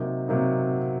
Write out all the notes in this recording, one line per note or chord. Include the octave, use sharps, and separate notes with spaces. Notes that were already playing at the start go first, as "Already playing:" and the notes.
Already playing: C3 F#3 A#3 D#4
C3 F#3 A#3 D#4